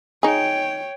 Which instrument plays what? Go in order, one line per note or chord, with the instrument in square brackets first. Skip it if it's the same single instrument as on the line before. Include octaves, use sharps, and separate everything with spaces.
[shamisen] D#4 G#4 [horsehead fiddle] C#5 G5